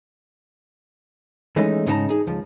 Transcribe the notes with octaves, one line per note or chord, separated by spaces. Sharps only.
E3 G#3 A3 C#4 D#4
G#2 C#3 D#4 A#4 A5 A#5
D#4 G#4
C#2 F3